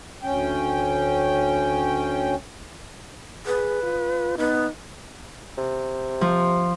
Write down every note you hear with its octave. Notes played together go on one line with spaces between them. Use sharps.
D2 C#4 G5
G#4 B4
F4
B3 D#4
C3
F3